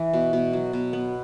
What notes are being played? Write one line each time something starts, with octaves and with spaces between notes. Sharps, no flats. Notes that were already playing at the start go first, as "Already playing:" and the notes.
Already playing: E3
B2
B2
F#3
B2
B3